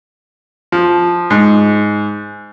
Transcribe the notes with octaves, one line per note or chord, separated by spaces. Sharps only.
F3
G#2